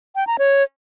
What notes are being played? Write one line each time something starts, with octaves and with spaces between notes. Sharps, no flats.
G5
A#5
C#5